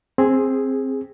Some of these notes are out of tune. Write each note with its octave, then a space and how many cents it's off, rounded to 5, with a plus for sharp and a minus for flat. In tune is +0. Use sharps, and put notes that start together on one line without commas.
C4 +10 G#4 +0